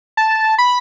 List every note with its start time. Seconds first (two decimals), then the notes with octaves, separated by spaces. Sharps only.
0.17 A5
0.58 B5